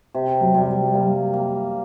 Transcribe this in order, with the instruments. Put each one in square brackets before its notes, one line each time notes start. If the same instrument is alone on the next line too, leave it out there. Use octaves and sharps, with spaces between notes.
[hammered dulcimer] C3
[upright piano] F#3
[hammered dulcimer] C3 [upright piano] G3
[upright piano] F#3
[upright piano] G3 [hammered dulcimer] A#3
[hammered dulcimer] A#3